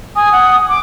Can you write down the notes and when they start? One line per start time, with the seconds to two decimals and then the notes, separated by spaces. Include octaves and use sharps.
0.16 G#5 D#6
0.32 F#5
0.69 D6